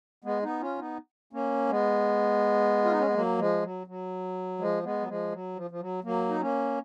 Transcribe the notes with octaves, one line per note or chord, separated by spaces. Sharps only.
G#3 B3
B3 D#4
C#4 F4
B3 D#4
A#3 C#4
G#3 B3
F4
D#4
C#4
B3
F#3 A#3
F3 G#3
F#3
F#3
F3 G#3
G#3 B3
F#3
F3 G#3
F#3
F3
F3
F#3
F#3 A#3
D#4
A#3 C#4